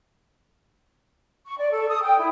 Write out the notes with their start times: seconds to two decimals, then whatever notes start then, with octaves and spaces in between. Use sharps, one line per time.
1.45 C#6
1.58 D5
1.72 A4
1.89 D#6
2.03 G5
2.18 E4